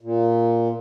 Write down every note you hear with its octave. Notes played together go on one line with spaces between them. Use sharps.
A#2